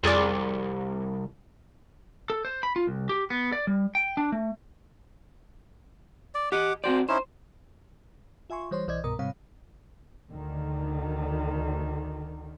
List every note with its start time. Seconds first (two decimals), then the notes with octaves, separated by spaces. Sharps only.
0.04 C2 F2 G#4 D5
2.30 A4
2.45 C5
2.63 B5
2.76 F4
2.87 C2
3.09 G4
3.30 B3
3.52 D5
3.67 G3
3.95 G5
4.17 D4
4.32 A3
6.35 D5
6.52 G4 D#5 F#5 D6
6.84 C4 F#4 C5 D5
7.09 C#4 D#4 E4 C5
8.50 F4 E5 G#5 C6 C#6
8.71 E3 G3 C5 C#5 C6
8.88 B1 E3 C5 D5 D#5 G#6
9.04 C2 G2 B2 A#4 A#5 D#6
9.19 G#2 C3 G3 C4 C#5 F5
10.31 D2 D3 D#3